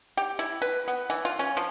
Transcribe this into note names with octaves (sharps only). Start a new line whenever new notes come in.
G4
E4
B4
B3
E3
F4
C#4
F3